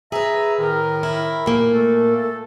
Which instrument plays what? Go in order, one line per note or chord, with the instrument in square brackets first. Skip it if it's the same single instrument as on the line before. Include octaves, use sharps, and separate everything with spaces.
[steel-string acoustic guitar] G#4 B4 [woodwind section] E5 A#5
[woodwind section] A2 D#3 A#4
[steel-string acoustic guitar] E4
A#2 A#3
[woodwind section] A3 A4